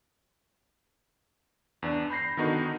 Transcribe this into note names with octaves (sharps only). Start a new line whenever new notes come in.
E2 D4
B5 G6 A#6 C7
D3 D#3 B3 D#4 F#4